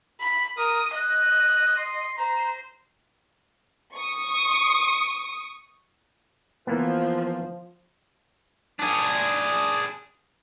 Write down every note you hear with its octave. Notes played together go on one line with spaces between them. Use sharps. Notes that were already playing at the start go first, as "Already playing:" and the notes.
B5
A#4 D#6
D#5 F#6
C6
C5 A#5
C#6 D#6
E3 F3 A#3 B3
D4 G#4